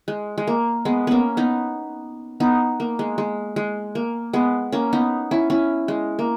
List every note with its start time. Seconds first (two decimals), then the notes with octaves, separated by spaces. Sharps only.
0.08 G#3
0.38 G#3
0.47 A#3
0.85 G#3 B3
1.07 A#3 B3 C#4
1.37 B3 D#4
2.40 B3 D#4
2.80 A#3
2.99 G#3
3.18 G#3
3.56 G#3
3.95 A#3
4.33 G#3 B3
4.72 A#3 C#4
4.93 B3 D#4
5.31 C#4 E4
5.50 C#4 E4
5.88 G#3
6.19 A#3